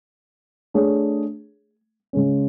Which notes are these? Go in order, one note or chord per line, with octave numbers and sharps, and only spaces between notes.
A3 D4 G#4 C#5
C#3 G#3 C#4